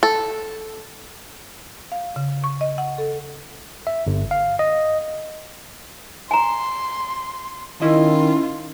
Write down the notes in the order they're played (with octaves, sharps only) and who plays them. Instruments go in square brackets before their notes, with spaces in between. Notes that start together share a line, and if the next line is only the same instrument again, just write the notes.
[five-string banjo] A4
[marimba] F5
C#3
C#6
D#5
F#5
A4
[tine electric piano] E5
G1
F5
D#5
[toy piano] G#5 A#5 [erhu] C6
[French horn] D#3 [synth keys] C#4 E4 D#5 [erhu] F4